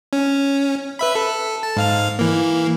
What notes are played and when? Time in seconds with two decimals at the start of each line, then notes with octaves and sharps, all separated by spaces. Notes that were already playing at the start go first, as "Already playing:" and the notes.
0.13 C#4
0.99 B4 E5 B5
1.15 A4
1.63 A5
1.77 G#2 F5 F6
2.19 E3 A#3